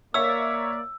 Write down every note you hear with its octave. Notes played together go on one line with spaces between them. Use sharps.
A#3 A#4 C#5 D5 E5 E6